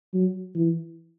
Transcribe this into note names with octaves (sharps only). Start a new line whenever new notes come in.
F#3
E3